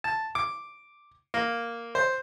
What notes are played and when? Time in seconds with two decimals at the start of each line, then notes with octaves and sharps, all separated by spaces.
0.04 A5
0.35 D6
1.34 A#3
1.95 C5